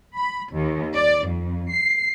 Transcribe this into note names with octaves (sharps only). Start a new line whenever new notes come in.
B5
D#2
D5
F2
C7